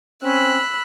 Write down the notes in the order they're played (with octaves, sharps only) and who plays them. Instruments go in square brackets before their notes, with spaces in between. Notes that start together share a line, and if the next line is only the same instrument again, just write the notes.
[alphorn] C4 [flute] C#4 [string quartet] B5 E6 F#6